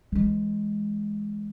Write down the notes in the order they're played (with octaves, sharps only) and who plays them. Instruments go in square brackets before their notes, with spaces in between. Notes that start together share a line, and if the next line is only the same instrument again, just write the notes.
[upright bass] E3 G#3